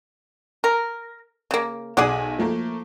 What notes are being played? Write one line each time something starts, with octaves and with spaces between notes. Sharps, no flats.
A#4
C#3 A#3
B1 G#4 D5 F#5 G#5
F3 A3 A#3